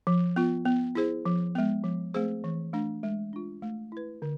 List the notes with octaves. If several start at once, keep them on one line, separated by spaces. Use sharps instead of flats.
F3
B3 F4
B3
E4 G#4 C5
F3
G#3 B3
F3
A3 C4 G#4 C5
E3
A3 D4
G#3
D4 F4
A3
E4 B4
D3